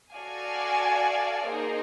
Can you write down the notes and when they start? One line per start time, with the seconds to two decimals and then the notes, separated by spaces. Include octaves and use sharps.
0.12 F#4 A4 D5 F5 G#5
1.49 A#3 D#4 G#4 C5